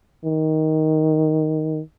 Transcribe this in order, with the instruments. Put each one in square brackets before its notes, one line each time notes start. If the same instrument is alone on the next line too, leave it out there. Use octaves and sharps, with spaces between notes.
[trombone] D#3